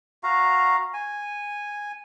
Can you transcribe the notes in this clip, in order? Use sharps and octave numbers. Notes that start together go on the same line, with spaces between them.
F#4 F5 A#5
G#5